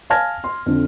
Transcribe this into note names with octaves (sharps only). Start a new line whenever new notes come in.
F5 G#5 A5 F6 G#6 A#6
C6
F2 D3